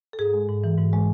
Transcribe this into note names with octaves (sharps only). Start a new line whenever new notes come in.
A4
G#2 G#4
G#3
G#2
E3
G#2
G#3